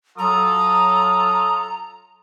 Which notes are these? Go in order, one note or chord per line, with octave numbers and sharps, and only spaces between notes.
F#3 F4 A4 A#5 D#6